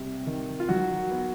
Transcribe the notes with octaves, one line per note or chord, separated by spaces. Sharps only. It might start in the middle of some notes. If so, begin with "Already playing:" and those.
Already playing: C3 G3
D#3
F4
D#3 F#3 F#4
B3